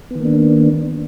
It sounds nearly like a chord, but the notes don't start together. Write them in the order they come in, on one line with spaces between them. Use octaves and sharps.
B3 D#3 A#3 D4